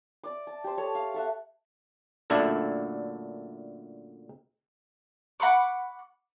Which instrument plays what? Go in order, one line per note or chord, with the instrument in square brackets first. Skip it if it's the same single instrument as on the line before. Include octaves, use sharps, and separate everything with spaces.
[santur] D5 D6
A5
G4 C5
A4 C#5
F5
A4 E5 F#5
[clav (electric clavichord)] F#2 A#2 D3 A3 D4 E4
[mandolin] F#5 B5 C#6 D6